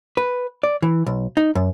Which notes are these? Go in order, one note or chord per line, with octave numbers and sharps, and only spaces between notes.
B4
D5
E3
B1
D#4
F#2